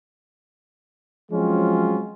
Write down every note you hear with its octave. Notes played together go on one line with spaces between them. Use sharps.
F3 F#3 G#3 C4 C#4 F4